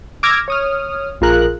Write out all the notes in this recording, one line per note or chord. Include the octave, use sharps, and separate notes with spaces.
D6 E6 F6 G#6 A#6
C#5 D#6 F6
A#1 F4 G#4 A#4 F#6